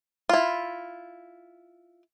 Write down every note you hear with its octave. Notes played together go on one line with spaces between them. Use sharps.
E4 F4